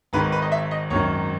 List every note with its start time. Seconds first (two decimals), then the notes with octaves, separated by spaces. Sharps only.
0.13 G#1 G#2 D#3 B4
0.32 B4
0.42 D#5
0.52 E5
0.71 D#5
0.90 G#1 F#2 D#3 C#5